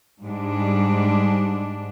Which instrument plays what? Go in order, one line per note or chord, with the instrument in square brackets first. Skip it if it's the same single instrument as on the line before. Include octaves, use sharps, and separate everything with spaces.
[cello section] G#2 G3 D4